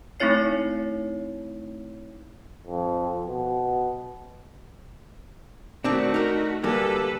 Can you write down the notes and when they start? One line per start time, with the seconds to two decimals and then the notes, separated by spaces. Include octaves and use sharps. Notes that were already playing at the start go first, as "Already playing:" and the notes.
0.20 A3 C4 D#4 E4 C#5 C7
2.67 F2
3.28 B2
5.84 D#3 A3 C4 D4 F#4
6.14 D#4 A#4
6.63 D2 G3 A#3 A4 B4